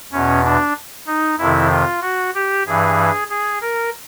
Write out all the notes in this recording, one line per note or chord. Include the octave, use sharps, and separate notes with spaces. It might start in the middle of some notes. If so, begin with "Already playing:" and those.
E2 B2 C#4
D4
D#4
F2 C3 D#3 E4
F4
F#4
G4
G2 E3 G#4
G#4
A#4